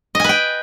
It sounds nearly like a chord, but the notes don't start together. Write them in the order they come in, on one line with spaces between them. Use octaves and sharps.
D#5 G#5 B4 G5